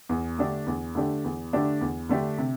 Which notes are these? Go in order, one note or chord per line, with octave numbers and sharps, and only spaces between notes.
E2
D3 A3 D4 G4
E2
D3 A3 D4 G4
E2
D3 A3 D4 G4
E2
D3 A3 D4 G4
C3